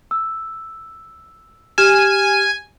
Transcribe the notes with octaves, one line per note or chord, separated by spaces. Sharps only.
E6
G4 G#5 F6 E7